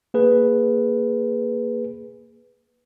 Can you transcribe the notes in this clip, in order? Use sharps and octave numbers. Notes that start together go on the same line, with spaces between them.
A#3 G#4 B4